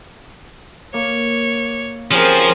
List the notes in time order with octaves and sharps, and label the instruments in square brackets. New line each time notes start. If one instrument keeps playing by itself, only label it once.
[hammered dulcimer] A#3 [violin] C#5
[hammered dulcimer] C#3 C4 G4 [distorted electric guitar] F3 [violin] G#4 A#4